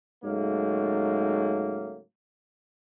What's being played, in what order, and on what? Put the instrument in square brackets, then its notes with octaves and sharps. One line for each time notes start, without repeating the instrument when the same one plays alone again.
[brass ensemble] G#2 C#3 F#3 A3 A#3